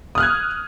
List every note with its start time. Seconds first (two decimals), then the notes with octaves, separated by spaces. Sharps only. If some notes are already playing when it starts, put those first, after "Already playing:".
0.15 D#6
0.18 F6
0.20 F#6
0.23 G#6